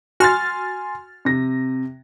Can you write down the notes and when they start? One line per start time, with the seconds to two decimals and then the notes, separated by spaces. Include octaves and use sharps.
0.20 F#4 G#5 C6 F6 A6
1.25 C3 A#6